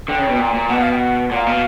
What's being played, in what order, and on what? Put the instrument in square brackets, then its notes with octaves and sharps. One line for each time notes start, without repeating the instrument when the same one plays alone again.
[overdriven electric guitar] D3 [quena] G5
[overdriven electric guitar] C#3
B2
A#2
A#2
[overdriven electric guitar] B2 [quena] F#5
[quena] F5
G5
F#5
[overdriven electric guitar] A#2 [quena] F#5
[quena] F5
[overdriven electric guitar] B2